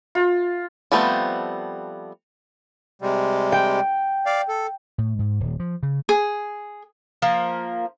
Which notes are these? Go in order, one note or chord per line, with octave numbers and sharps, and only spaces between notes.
F4
F3 G3 A3 B3 C4
C3 G3 G#3
G5
D5 F5
A4
A2
G#2
D#1
F3
C#3
G#4
F3 A#3 A#4